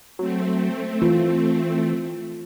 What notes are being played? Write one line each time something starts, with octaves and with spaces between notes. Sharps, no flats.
F#3 A3 C4
E3 F4